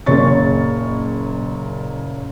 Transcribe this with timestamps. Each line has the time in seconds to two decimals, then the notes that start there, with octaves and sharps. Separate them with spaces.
0.06 F#1 A#2 C#5 C#6 A6